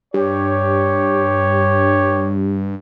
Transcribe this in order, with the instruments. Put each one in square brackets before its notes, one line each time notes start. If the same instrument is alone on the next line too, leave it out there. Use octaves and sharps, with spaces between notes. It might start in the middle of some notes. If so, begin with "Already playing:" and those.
[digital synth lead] G2 [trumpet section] G4 C#5